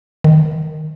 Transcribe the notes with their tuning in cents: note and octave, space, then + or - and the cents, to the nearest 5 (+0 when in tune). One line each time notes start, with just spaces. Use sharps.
D#3 -10